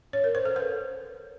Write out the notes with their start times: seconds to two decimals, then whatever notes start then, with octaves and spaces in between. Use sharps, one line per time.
0.13 C#5
0.24 A#4
0.35 C5
0.45 A4
0.56 B4